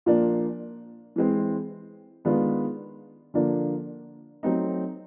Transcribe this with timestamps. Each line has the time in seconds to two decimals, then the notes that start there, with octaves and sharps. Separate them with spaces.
0.06 A#2 F3 A#3 D4
1.16 E3 G#3 C4
2.25 D#3 G#3 B3 D4 F4
3.34 D3 F3 A#3 D4
4.43 F#3 A3 C4 D#4